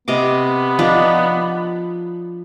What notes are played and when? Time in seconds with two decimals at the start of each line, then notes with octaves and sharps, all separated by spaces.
0.08 C3 B3 D#5 D6
0.79 F3 D4 D#4